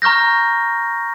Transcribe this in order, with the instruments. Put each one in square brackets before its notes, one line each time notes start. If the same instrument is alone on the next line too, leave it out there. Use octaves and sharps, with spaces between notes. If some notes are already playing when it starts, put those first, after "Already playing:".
[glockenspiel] A#5 C#6 F6 G6 A#6